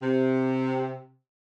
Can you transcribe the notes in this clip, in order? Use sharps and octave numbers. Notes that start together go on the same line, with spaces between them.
C3